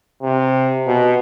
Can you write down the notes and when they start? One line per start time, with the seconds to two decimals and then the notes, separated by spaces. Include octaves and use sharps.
0.22 C3
0.87 B2